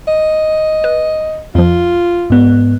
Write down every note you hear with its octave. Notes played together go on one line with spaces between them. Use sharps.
D#5
B4
F2 F3 F4
G#2 B3